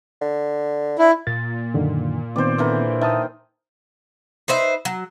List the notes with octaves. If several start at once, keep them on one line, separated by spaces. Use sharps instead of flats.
D3
D4 E4
A#2 A6
F#2 D3 D#3
D#3 B3 C4 C5 D5
D3 E3 A#4
D#3 E5 A5 D#6
D#4 B4 C5 E5
F#3